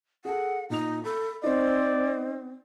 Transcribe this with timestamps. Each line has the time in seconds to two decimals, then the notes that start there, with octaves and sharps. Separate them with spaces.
0.25 G#4 A4 F#5
0.70 A#2 D#4 F7
1.04 A4 B5
1.43 C4 D#4 C5 D5